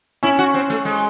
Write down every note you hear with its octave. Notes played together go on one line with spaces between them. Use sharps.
C#4 E4
F#4
C4
A3
G#3